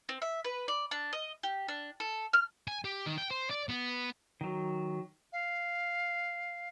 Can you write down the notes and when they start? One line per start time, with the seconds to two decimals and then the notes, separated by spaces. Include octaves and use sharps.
0.09 C4
0.22 E5
0.44 B4
0.68 D5
0.91 D4
1.13 D#5
1.43 G4
1.68 D4
2.00 A4
2.33 F6
2.68 G#5
2.85 G4
3.06 D#3
3.18 G5
3.31 C5
3.50 D5
3.69 B3
4.41 D#3 F#3
5.33 F5